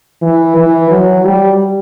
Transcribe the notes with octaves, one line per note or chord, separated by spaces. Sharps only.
E3
E3
F#3
G3